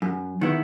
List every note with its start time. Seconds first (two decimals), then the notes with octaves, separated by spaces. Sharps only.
0.02 F#2
0.41 D#3 G#3 B3 E4